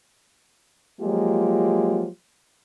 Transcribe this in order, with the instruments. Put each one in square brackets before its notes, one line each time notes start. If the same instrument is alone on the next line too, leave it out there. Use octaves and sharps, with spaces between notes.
[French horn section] F3 F#3 G#3 A#3 F4 G4